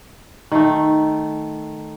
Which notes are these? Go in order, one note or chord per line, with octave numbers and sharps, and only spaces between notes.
D#3 A3